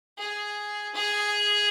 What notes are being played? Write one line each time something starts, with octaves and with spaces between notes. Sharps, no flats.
G#4
G#4